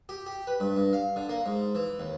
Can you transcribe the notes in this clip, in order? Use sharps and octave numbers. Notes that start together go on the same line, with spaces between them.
G4
G4
B4
G2
G2
F5
D3
A#3
G#2
E3
D#2